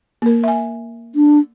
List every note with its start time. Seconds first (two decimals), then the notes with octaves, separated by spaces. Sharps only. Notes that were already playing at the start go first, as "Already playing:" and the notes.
0.22 A#3 A#4
0.44 E5 G#5
1.15 D4